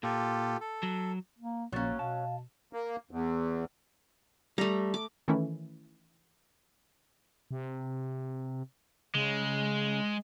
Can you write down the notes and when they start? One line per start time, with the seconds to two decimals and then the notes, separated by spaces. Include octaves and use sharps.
0.03 A#2 F4 G4 A4
0.60 A4
0.83 F#3
1.38 A#3
1.72 A#1 F#3 A#3 C#4 C#6 A6
1.99 B2 F5 A5
2.73 A#3
3.11 E2
4.58 G3 A3 A#5
4.94 D6
5.28 D#3 E3 A3 C#4 E4
7.51 C3
9.15 C#3 G#3